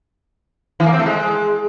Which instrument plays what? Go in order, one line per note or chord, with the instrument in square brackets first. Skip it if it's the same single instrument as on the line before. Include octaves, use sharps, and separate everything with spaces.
[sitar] E3
A#3
C4
A3
G#3